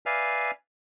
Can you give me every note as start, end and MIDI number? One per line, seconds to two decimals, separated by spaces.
0.06 0.51 71
0.06 0.51 74
0.06 0.51 76
0.06 0.51 77
0.06 0.51 80
0.06 0.51 89